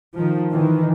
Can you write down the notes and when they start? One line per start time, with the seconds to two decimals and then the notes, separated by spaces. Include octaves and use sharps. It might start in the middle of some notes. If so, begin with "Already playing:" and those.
0.16 D#3 F3
0.52 D#3 E3